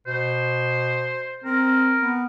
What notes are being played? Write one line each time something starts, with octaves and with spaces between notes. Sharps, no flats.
B2 C5
C4 A#4
B3